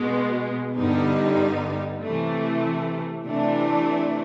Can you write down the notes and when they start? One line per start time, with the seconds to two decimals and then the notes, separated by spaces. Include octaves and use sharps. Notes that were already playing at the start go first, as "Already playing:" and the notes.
Already playing: B2 G#3 B3
0.76 G2 D3 G3 B3 D#4
2.01 C3 E3 A3
3.25 C3 E3 A3 D4